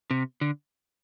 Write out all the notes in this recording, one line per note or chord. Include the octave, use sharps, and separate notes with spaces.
C3
D3